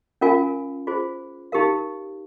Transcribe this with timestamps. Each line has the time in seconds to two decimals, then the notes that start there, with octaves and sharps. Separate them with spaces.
0.21 C#4 F4 A#4 F5 G#5
0.87 F4 G#4 C5
1.52 D#4 G4 A#4 F5